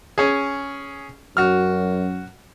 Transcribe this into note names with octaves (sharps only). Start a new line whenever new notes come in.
C#4 G#4
F#2 F#4 F6